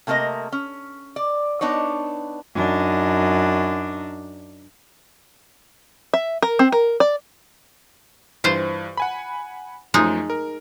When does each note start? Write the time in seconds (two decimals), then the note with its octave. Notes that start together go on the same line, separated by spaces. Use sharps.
0.07 C3 A3 A#3 A#4 D#5
0.52 C#4
1.16 D5
1.61 B3 D4 D#4 C#5
2.55 F#2 D4 D#4
6.14 E5
6.43 A#4
6.59 C4
6.72 A#4
7.00 D5
8.44 G2 E3 F4 C5
8.97 F#5 G#5 B5
9.94 F#2 F3 G#3 A3 D#4
10.30 A#4